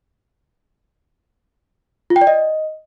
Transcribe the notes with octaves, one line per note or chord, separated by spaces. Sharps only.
F4
G5
D5
D#5